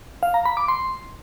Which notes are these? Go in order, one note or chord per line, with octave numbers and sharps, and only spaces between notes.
F5
A#5
B5
D6
C6